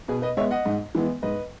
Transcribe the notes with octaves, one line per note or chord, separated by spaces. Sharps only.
B2 G#4 B4
B4 D#5
G#3 B3 C#5 E5
D#5 F#5
G#2
E3 G#3 B3
G#2 B4 D#5